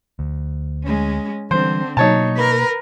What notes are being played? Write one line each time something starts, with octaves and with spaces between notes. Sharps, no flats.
D2
G#3 C#4
D3 E3 G3 C4 C5
B2 F#3 A#3 D#4 C#5 A5
A#4 B4